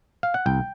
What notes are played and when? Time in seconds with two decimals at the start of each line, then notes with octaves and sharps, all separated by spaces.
0.23 F5
0.34 F#5
0.46 C2 G5